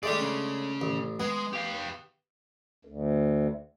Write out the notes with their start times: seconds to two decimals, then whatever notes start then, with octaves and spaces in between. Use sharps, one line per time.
0.03 G#3 A3 D4 G4 D5
0.18 C#3 C#4
0.81 A1
1.20 G#3 B3
1.53 G4 F5
2.85 D2